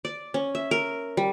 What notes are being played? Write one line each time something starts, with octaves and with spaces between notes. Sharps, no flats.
D5
C#4
E5
A#4
G3